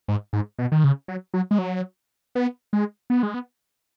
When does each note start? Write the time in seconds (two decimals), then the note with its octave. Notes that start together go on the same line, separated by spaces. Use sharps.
0.08 G#2
0.33 G#2
0.59 B2
0.72 D#3
0.84 C#3
1.08 F#3
1.34 F#3
1.51 G#3
1.58 F#3
2.35 B3
2.73 G#3
3.10 B3
3.23 G#3
3.34 B3